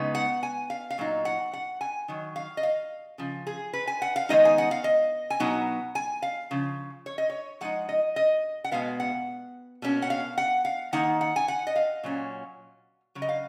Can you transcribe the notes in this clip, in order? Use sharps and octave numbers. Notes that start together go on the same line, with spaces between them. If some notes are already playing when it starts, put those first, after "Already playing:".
Already playing: C#3 G#3 B3 D#4
F#5
G#5
F5
F5
A#2 F#3 D#4
F#5
F#5
G#5
D#3 F#3
F5
D#5
F5
C#3 F3
G#4
B4
G#5
F#5
F5
D#3 G#3 B3 D#4 D#5
G#5
F#5
F5
D#5
G#5
B2 F#3 B3 D#4 F#5
G#5
F5
C#3 F3
C#5
D#5
C#5
F3 G#3 D#4 F#5
D#5
D#5
F#5
B2 G#3 B3 F5
F#5
B2 A#3 C#4
F#5
F5
F#5
F5
D#3 A#3 D#4 F#5
F#5
G#5
F#5
D#5
F5
A#2 F#3 C#4
C#3 F#3
D#5
F5